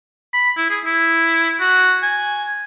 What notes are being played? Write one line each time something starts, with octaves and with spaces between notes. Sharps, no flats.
B5
E4
G#4
E4
F#4
G#5